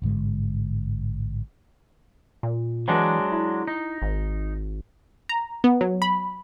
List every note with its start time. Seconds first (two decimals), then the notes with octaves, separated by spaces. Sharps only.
0.02 A1 G#2 D3 G#3
2.43 A#2
2.88 E3 F#3 G#3 D4
3.32 E4
3.68 D#4
4.02 G#1
5.29 A#5
5.64 B3
5.81 F#3
6.02 B5